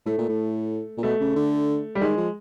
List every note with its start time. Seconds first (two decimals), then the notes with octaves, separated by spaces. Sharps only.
0.06 A2 A3
0.18 A#2
0.29 A2
0.97 A#2
1.03 B2 A3
1.20 C#3
1.36 D3
1.95 G3
2.01 D#3 G#3
2.17 F3